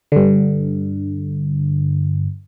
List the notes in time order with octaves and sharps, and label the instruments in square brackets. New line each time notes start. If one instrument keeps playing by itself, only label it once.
[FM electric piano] G2 D3